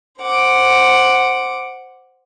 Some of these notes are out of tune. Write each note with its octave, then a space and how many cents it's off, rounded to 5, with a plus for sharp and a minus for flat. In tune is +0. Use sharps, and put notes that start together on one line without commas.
C5 +0 F#5 +0 D6 +0